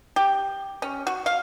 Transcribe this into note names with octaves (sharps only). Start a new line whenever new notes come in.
G4
C#4
F#4
F5